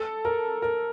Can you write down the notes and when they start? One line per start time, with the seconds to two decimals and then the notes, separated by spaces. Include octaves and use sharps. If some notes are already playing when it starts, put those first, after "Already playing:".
Already playing: A4
0.25 A#4
0.62 A#4